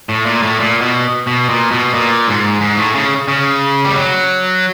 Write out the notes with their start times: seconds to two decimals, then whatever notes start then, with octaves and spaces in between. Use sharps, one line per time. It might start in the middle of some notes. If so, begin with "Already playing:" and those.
0.09 A2
0.26 A#2
0.43 A2
0.60 A#2
0.82 B2
1.27 B2
1.49 A#2
1.71 B2
1.94 A#2
2.27 G#2
2.61 G#2
2.77 A2
2.95 C#3
3.28 C#3
3.85 G3
3.95 F#3